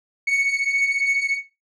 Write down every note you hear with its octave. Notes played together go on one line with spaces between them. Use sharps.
C#7